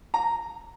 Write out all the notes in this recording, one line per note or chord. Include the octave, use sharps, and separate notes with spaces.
A#5